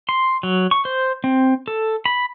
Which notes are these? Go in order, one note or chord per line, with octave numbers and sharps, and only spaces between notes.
C6
F#3
C#6
C5
C4
A4
B5